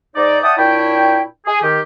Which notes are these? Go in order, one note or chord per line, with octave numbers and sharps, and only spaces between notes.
G#2 D#4 D5
D5 E5 F#5 G5 A5 D#6
A#2 D4 E4 C#5 G5
G#4
D#3 G4